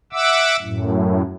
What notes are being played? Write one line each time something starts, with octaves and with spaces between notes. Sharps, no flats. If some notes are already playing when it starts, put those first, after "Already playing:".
E5 F#5 D6 E6
F#2 A2